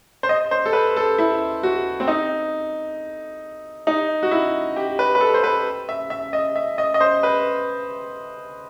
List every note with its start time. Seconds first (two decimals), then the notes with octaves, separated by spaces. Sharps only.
0.23 C5
0.29 D#5
0.51 C5
0.66 A4
0.73 B4
0.97 A4
1.18 E4
1.63 F#4
2.00 C4
2.08 D#4
3.87 D#4
4.23 F#4
4.31 E4
4.76 G4
4.99 B4
5.15 B4
5.21 A4
5.34 C5
5.44 B4
5.89 E5
6.10 E5
6.33 D#5
6.56 E5
6.78 D#5
6.94 D#5
7.01 C5
7.23 B4